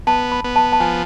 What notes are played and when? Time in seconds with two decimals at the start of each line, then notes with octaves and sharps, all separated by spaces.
0.07 B3 A5
0.32 B5
0.44 B3
0.56 A5
0.72 A5
0.80 F3 G#5